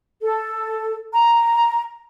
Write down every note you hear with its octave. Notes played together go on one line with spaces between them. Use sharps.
A4
A#5